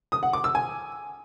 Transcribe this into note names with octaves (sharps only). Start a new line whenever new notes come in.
D#6
F#5
D6
E6
G#5